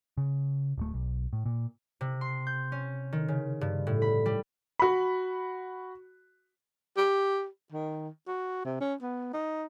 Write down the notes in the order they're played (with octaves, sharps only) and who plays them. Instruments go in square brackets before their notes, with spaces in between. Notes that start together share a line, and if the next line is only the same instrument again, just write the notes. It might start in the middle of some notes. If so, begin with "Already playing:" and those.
[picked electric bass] C#3
D1 A3
B1
A2
A#2
[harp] C3
C6
G6
C#4
D#3
C#3
G2
A2
B5
G3
[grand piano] F#4 B5
[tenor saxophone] G4
D#3
F#4
C3
C#4
B3
D#4